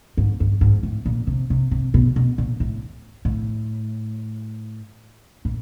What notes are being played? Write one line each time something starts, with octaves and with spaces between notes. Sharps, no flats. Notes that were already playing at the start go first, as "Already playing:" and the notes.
G#2
G2
G#2
A2
A#2
C3
C3
C3
B2
B2
A#2
A2
A2
A#2